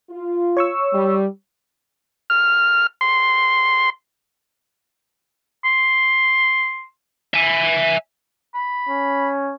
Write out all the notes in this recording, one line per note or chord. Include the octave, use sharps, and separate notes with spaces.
F4
C#5 C#6 E6
G3
F6
C6
C6
E5 G#5
B5
C#4